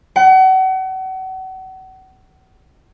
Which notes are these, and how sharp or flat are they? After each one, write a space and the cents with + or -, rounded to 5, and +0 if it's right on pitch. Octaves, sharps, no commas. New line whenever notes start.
F#5 +35